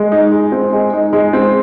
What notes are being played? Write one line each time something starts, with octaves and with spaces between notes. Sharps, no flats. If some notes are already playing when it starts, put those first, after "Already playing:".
Already playing: G#3
D#4
G#3
C4
G#3
D#4
G#3
C4